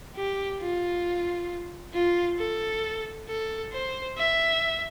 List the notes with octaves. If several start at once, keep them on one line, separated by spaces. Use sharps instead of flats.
G4
F4
F4
A4
A4
C5
E5